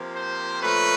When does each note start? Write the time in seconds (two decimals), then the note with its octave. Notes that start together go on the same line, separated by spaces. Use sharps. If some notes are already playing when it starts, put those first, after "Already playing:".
Already playing: C3 F3 A#3
0.16 C5
0.61 A#2 F3 A3 C#4 B4